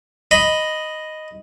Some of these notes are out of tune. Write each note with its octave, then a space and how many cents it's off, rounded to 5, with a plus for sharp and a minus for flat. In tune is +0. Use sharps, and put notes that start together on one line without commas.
D#5 +0 B5 +0